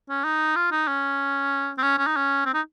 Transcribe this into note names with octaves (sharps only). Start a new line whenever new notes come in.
C#4
D#4
F4
D#4
C#4
C4
C#4
C#4
D#4
C#4
C4
D#4